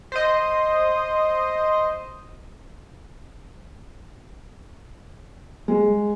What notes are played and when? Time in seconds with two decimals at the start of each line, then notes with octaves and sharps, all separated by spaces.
0.12 C5 D#5
5.68 G#3